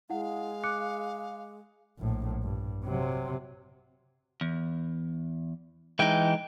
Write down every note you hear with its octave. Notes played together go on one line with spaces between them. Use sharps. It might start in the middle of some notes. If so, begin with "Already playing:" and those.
G#3 E4 F5 F#5
D6 F#6 C#7
A#1 A2
G2
C3 F#3
E2
E3 G#3 D#4 G5